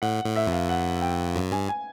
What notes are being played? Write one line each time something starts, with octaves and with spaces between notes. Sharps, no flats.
A2 F#5
A2
E5
F2
F5
F#5
G5
F#2
G2 G#5
G#5